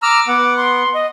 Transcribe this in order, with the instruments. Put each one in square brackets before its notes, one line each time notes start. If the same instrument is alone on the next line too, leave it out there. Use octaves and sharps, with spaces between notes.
[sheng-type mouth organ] A#5 E6 F6 [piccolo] D6
[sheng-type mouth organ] B3 F#5
[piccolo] C6
D#5